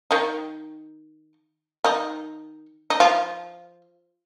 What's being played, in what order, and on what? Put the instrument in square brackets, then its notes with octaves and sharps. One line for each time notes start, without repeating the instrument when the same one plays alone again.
[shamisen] D#3 D#4
D#3 D#4
D#4
F3 F4